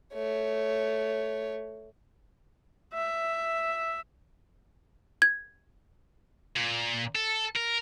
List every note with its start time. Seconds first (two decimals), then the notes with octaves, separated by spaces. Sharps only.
0.14 A3 C#5
2.94 E5
5.22 G#6
6.56 A#2
7.15 A4
7.55 A#4